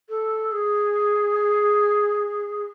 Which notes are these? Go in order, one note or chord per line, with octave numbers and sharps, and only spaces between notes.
A4
G#4